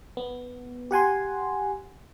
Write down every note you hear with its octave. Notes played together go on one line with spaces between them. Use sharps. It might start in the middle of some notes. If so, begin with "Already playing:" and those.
B3
G4 F#5 G#5 C6